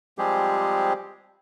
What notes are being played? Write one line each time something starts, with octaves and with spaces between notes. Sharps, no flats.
F3 G3 G#3 C4 G4 G#4